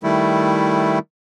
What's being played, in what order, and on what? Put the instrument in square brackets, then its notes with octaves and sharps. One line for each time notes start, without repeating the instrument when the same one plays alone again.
[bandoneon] D#3 G3 A3 E4